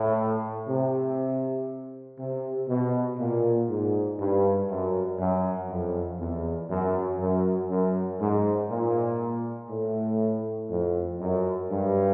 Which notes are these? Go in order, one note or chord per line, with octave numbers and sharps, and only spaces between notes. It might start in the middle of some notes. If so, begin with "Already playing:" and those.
Already playing: A2
C3
C3
B2
A#2
G#2
G2
F#2
F#2
F2
E2
F#2
F#2
F#2
G#2
A#2
A2
F2
F#2
G2